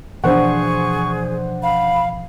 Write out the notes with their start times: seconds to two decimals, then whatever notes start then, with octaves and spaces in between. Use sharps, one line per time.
0.24 B2 E3 F3 D4 G#4 C5 F#5 C#6
1.63 F5 B5